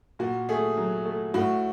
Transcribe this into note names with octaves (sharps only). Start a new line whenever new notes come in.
A#2 F#4
A3 G#4
F#3
A3
A2 F#4